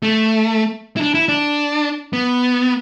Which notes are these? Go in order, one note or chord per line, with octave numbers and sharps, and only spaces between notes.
A3
E4
D4
E4
D4
B3